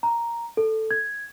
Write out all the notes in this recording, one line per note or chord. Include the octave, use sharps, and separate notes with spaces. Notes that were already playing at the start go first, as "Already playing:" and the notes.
A#5
A4
G#6